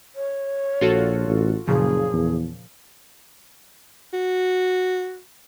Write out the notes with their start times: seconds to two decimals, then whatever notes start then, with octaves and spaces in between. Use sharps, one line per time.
0.15 C#5
0.81 A#1 F4 F#4 A4
1.28 A1
1.68 F#1 A#2 C#3 F3 G#4
2.13 E2
4.13 F#4